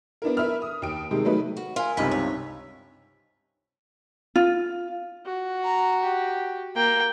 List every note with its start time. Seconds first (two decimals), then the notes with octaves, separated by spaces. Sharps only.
0.22 B3 D4 E4 A#4
0.37 A#4 B4 E5 B5 F6
0.62 D#6
0.82 D#2 D7
1.11 C3 D#3 G3 G#3
1.25 F#3 G3 A3 D#4 B4
1.57 F#4
1.76 F4 A#4 G#5
1.97 C#2 G2 C3 D#4 B4 D#5 F5 B6
2.11 C#5
4.36 F4
5.26 F#4
5.64 A#5
6.03 G4
6.76 A#3 G5